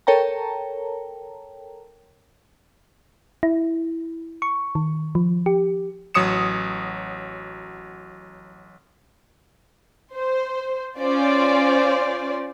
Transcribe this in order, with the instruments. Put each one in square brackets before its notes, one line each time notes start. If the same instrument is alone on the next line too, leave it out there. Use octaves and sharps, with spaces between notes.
[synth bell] A4 A#4 C#5 G5 A5 A#5
[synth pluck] E4
C#6
D#3
F3
G4
[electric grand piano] A1 F#3 C#5 D#6 C#7 E7
[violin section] C5
C#4 F4 C5 D5